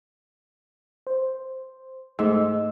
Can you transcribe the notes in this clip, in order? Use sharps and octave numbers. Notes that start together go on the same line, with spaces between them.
C5
G#2 A3 E6